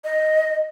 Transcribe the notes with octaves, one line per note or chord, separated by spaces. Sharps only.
D#5